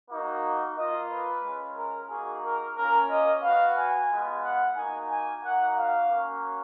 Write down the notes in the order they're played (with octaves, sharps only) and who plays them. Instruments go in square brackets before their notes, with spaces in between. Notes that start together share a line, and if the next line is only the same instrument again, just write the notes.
[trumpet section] A#3 D#4 F#4
A#3 F4 D#5
B4
G#3 C#4 F4
A#4
A#3 D#4 F#4 G#4
A#4
A#3 C#4 F4 A#4
D#5
B3 F#4 F5
G#5
G#3 B3 F4
F#5
A#3 D#4 F#4 G#5
G#5
A#3 D#4 F#4 F#5
F5
A#3 C#4 F#4